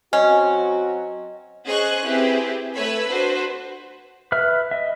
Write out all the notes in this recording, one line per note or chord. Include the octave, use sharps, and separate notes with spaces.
F#3 C4 C#4 F#4 D#5
C#4 G#4 C5 D#5 C#6 F#6
C4 E4 G4 G#4 B4
A3 B4 C#5 B5 E6
D4 F#4 B4 C5
B4 E5 F6
D#5 E5